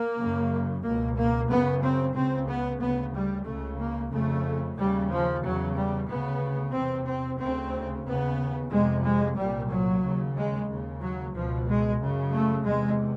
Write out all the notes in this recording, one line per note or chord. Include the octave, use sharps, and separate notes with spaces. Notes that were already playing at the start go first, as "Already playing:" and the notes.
Already playing: A#3
F#2 C#3
C#2 B2 A#3
A#3
F#2 C#3 B3
C4
C#2 C#3 C4
B3
D2 C#3 B3
G3
C#2 C#3 A3
A#3
F2 C#3 A3
D#2 C#3 G3
F3
E2 C#3 F#3
G3
D2 C#3 B3
E2 C3 C4
C4
D2 C#3 C4
D#2 C#3 B3
F2 C3 G#3
G#3
C2 A#2 G3
F#3
D#2 C#3
G#3
D#2 C#3
F#3
C#2 B2 F3
G#3
F#2 C#3
A3
E2 C3 G#3